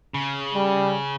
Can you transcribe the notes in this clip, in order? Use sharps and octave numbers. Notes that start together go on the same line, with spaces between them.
C#3
G3